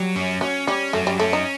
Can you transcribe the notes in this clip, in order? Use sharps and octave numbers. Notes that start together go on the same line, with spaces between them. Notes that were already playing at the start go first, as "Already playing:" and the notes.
Already playing: F#3 G3
C#4
F#3 C#4
G3 C#4
F#3 A3
G3
A3 C#4
D#4